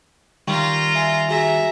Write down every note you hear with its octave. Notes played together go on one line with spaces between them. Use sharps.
D#3 G3 F4 G5 A#5 C#6
E5 G#5 C7
F#4 G#4 E5 G#5 A#5